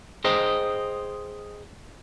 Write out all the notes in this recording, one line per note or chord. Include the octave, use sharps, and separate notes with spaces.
G#4 C5 D#5 G5 A#5